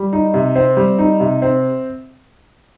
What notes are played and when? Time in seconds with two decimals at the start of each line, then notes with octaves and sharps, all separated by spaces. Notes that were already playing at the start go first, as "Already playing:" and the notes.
Already playing: G3
0.13 D#4
0.34 C3
0.55 C4
0.77 G3
0.99 D#4
1.20 C3
1.42 C4